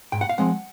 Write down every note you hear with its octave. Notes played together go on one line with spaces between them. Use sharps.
G#2 G5
F#5
F5
F3 G#3 C4 F#5